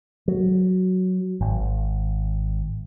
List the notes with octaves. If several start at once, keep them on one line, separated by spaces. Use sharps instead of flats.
F#3
G#1